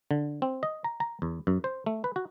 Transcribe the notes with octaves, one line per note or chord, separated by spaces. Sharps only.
D3
C4
D#5
A#5
A#5
E2
F#2
C5
A3
B4
F#4